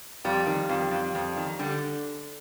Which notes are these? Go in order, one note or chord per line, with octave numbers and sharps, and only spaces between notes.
F2 G3
D#3
F2
F2
F2
D#3
D3 G3